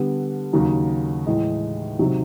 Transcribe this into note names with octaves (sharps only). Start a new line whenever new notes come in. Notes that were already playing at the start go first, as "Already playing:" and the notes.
Already playing: D3 G3 B3
D#2 C#3 F#3 A#3
A2 E3 G#3
C3 D#3 F#3